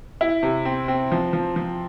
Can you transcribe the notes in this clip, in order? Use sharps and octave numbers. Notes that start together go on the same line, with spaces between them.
E4
C3
C4
C4
F3
F3
F3